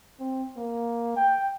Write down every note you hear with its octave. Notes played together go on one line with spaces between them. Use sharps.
C4
A#3
G5